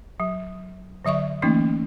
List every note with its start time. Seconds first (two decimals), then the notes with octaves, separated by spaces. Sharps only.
0.20 F#3
1.05 D3 F#3 D5 E5 C#6
1.42 E3 A3 A#3 C#4 D#4